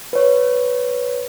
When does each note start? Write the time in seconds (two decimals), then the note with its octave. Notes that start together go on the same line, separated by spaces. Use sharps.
0.13 B4 C#5